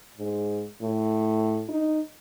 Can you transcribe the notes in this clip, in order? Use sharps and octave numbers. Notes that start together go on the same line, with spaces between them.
G#2
A2
D#4